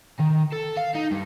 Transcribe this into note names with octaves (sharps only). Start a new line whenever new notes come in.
D#3
A4
F5
D#4
G2